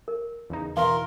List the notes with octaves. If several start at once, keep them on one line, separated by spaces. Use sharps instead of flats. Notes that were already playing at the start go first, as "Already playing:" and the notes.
A#4
E2 C#3 D#4
B2 E3 A#4 F5 C6